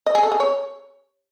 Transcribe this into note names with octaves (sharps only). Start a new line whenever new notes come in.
D#5
G#4
A4
G#4
C#5